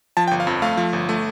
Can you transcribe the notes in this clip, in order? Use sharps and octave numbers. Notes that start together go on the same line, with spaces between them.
F3 A5
G5
G1
F5
F2
A3 F5
F3
G1
A3